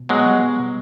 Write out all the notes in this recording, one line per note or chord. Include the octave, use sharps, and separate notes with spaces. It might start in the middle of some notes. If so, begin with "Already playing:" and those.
Already playing: B2
F#3 G#3 B3
G3
B2
B2